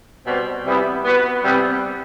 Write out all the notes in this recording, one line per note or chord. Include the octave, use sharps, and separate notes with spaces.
B2 G3 C4 F#4 C5
C3 E3 G3 B3 E4
B3 F#4 B4
C3 E3 G3 B3